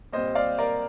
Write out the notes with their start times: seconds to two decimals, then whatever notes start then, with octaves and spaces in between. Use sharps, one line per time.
0.13 A#2 G3 C4 C5 D#5
0.35 D5 F5
0.59 A#4 D5